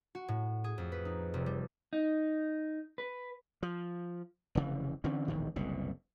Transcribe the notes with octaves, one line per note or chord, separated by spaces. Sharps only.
F#4
A2
G#4
F2
B4
D#4
F1
G3
D#4
B4
F3
F1 C#3 E3
D3 E3 C4 C#4
E1 A#1 A2 D#3
F#1 C2 B2